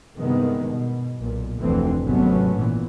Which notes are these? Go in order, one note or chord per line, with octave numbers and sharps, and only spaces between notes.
G2 C3 D#3 G#3 B3
B2
B1 A#2
F1 D2 D3 E3 C4
G#1 C3 F#3 A3 B3 C#4
A#2 E3